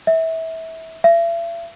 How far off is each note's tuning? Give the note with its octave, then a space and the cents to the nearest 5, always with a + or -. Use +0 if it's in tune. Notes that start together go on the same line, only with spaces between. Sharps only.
E5 -25
E5 +40